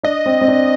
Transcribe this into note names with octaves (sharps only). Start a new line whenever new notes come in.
D4 D#5
C4
C4
D4